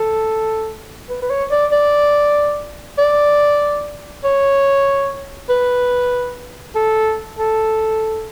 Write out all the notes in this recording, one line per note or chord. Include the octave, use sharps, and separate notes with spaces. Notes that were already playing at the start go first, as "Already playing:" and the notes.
Already playing: A4
B4
B4
C#5
D5
D5
D5
C#5
B4
A4
A4